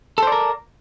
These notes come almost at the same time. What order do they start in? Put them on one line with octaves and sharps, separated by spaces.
A4 C5 D5 A#4